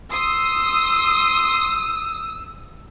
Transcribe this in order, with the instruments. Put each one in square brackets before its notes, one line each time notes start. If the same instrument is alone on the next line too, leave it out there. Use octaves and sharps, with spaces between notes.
[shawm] C6 [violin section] D#6 [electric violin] E6